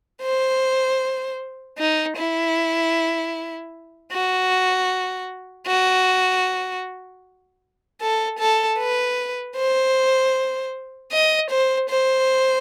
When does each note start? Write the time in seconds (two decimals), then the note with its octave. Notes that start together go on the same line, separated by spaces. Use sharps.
0.22 C5
1.78 D#4
2.17 E4
4.12 F#4
5.67 F#4
8.01 A4
8.39 A4
8.78 B4
9.56 C5
11.12 D#5
11.50 C5
11.90 C5